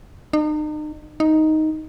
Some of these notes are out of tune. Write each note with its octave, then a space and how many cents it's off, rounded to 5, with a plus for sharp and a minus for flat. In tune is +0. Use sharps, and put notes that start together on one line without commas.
D#4 -40
D#4 +5